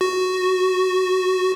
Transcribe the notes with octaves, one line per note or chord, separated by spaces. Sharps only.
F#4